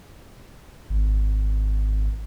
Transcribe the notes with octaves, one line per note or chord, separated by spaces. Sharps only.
G#1